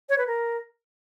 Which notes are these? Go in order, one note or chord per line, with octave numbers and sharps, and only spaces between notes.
C#5
B4
A#4